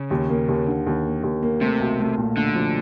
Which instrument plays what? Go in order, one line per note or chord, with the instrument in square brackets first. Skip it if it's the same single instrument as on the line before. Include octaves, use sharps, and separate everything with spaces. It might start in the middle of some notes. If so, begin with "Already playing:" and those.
Already playing: [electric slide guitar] C#3
[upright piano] D#2
A#3
D#2
D3
D#2
A#3
D#2
A#3
[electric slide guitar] C3 [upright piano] A3
[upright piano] B1
A3
A#2
[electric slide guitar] D3 [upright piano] A3
[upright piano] F3